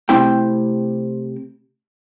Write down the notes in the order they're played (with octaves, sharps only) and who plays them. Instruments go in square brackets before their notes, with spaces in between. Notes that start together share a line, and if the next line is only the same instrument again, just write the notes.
[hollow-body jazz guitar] C3 A3 C4 E4 G5